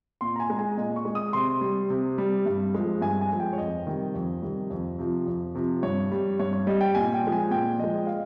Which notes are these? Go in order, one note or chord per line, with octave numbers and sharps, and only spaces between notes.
A#2 C6
A#5
G#5
G#3
G#5
A#2 D#5
C#6
G#3
D#6
C3 C6
G3
C3
G3
G2
F3 G#3
G2 G#5
G#5
F3 G#3
G5
C#5
F2 D#5
C3 D#3 G3
F2
C3 D#3 G3
F2
C3 F3
F2
C3 F3
G2 C#5
G3
G2 C#5
C#5
G3 D#5
G5
A#2 G#5
G5
F3 G#3
G#5
A#2 G5
F3 G#3 D#5
F5